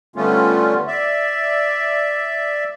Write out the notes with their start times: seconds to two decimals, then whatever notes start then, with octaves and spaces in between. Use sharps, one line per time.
0.16 D3 G3 A3 B3 C#4 F4
0.87 D5 E5